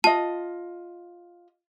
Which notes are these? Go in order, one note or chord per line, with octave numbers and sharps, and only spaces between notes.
F4 D#5 A5